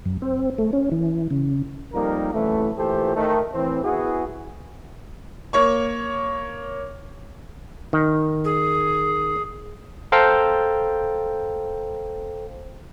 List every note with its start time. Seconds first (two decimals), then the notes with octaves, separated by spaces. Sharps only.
0.05 F#2
0.22 C4
0.58 A3
0.73 C#4
0.92 E3
1.31 C#3
1.93 F2 G3 A#3 D#4 A#4
2.33 C2 F#2 E3 A3
2.77 A#2 E3 A3 G4 A4 C5
3.15 D#3 A3
3.53 A2 E3 C4
3.84 B3 E4 F#4 G#4
5.53 A#3 C#5 C#6
7.93 D#3
8.44 G#4
10.12 A4 C5 F5 G5 A#5